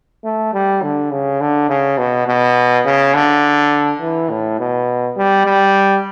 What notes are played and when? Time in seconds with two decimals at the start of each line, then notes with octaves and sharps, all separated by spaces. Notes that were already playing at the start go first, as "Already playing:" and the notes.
0.24 A3
0.53 G3
0.82 D3
1.11 C#3
1.41 D3
1.69 C#3
1.98 B2
2.27 B2
2.85 C#3
3.14 D3
4.01 E3
4.30 A2
4.59 B2
5.16 G3
5.46 G3